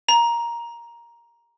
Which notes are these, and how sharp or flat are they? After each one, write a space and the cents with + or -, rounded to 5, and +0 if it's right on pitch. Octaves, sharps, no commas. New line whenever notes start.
A#5 +10